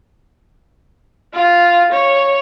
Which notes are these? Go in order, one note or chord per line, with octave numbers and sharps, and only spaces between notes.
F4
C#5